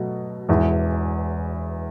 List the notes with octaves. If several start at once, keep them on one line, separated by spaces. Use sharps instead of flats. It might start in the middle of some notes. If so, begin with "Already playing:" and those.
Already playing: B2 F#3 A3
E1 E2 E3